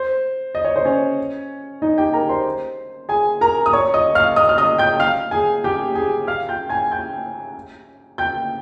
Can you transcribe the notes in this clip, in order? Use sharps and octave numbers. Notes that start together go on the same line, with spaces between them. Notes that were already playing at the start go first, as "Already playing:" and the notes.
Already playing: C5
D#5
C#5
C5
C#4 C#5
D#4 D#5
G4 G5
A#4 A#5
C5 C6
G#4 G#5
A#4 A#5
D#6
C#5 C#6
D#5 D#6
F5 F6
D#5 D#6
F6
D#5 D#6
G5 G6
F5 F6
G#4 G#5
G4 G5
G#4 G#5
F5 F6
G5 G6
G#5 G#6
G5 G6
G5 G6